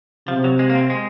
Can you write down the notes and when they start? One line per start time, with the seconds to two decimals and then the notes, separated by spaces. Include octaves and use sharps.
0.28 C3 F3
0.44 F#3
0.59 G#3
0.70 A#3
0.75 C4
0.90 G#3